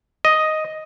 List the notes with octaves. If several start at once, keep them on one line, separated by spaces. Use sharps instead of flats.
D#5